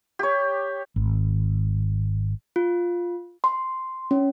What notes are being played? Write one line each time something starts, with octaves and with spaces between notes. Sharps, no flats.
G4 C#5
G#1
F4
C6
C#4